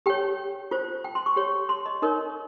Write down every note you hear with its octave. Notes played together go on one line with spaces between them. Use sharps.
G4 C#5 G5
F4 C5
G5
C6
C#6
G4 C#5
C6
D#5
D#4 A#4 C#5 D#5